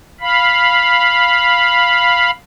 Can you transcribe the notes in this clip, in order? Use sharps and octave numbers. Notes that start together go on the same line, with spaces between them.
F5 B5